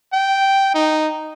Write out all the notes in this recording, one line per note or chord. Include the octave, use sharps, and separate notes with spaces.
G5
D#4